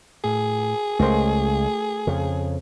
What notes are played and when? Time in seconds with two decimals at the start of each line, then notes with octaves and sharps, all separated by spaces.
0.24 A2 G#4
0.99 C#2 A3 A#4 C5
2.07 F2 C#3